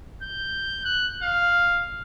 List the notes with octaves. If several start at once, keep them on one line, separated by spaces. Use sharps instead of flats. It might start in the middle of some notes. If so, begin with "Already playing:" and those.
G6
F#6
F5